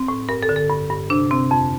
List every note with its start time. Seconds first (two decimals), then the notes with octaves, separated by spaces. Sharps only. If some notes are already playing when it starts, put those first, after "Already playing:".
Already playing: C4
0.08 A2
0.29 G2 A#4
0.42 A4
0.49 D3
0.56 A4
0.69 G2
0.90 G2
1.10 C3 D4
1.31 C3 C4
1.51 F2